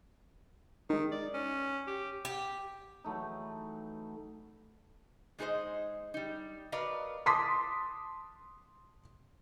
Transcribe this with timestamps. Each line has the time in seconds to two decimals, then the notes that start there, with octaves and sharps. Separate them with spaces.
0.90 D#3 G#3 D#4
1.12 D5
1.34 C#4
1.87 G4
2.25 G4
3.04 E3 F#3 A3 D#4
5.39 G#3 D#4 G#4 A#4 C5 D#5
6.14 G3 D#4
6.72 F#4 A#4 B4 D5 D#5 F5
7.26 A5 C6 D6 D#6 B6